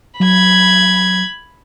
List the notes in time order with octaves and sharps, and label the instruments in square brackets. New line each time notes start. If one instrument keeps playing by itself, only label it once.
[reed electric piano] F#3 [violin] B5 G#6